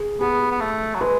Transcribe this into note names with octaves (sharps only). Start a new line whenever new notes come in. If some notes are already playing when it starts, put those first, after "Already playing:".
Already playing: G#4
B3 G#4
B3
A3
F#3
G#3 B4